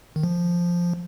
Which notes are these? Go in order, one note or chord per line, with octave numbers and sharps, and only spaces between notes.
D#3
F3